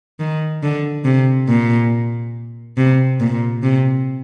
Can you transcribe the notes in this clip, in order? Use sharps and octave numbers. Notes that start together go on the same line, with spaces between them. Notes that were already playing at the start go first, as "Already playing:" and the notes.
D#3
D3
C3
A#2
C3
A#2
C3